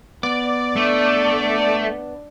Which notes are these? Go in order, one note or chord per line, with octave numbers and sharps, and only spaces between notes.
B3 D5
A3 D4